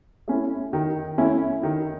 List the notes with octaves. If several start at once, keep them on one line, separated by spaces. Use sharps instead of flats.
A3 C#4 E4
D#3
A3 C#4 E4
D#3